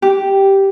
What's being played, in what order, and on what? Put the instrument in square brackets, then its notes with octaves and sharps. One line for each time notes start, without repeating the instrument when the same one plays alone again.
[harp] G4